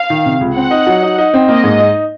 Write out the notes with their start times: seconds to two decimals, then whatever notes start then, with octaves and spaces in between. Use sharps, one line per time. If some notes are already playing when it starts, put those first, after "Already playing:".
Already playing: F5
0.10 D#3
0.26 C3
0.41 C#2
0.56 C4 F#5
0.71 D#4
0.87 F#3
1.03 D#4
1.18 D#4
1.34 C4
1.48 A#3 D#5
1.64 G#2
1.79 D#4